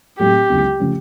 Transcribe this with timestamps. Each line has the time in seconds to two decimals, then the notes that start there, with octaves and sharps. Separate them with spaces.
0.19 A2 F#3 A3 C4 G4
0.49 C#2 C#3 F#3 B3 E4
0.80 C#3 F3 A3 C#4